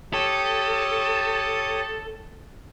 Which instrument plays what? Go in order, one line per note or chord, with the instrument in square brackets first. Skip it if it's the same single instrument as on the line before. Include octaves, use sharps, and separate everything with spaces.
[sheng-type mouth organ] G4 C#5 D#6 [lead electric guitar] A4